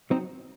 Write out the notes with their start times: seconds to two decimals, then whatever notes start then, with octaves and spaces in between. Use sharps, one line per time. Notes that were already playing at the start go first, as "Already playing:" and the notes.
0.10 F#3 C4 D#4